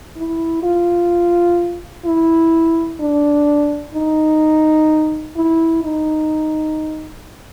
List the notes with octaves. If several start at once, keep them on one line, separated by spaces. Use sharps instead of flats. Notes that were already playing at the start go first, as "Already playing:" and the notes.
E4
F4
E4
D4
D#4
E4
D#4